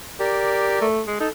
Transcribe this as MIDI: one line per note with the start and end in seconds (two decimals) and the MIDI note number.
0.20 0.80 67
0.20 0.86 70
0.20 0.86 74
0.81 1.02 57
1.07 1.17 56
1.20 1.28 63
1.20 1.29 69